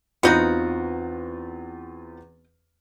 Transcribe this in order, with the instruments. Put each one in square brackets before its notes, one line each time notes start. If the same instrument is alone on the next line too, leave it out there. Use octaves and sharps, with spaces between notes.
[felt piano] E2 C4 F4 [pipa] B3 D#4 F#4